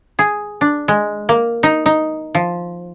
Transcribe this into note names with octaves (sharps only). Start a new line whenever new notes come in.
G#4
D4
G#3
A#3
D#4
D#4
F3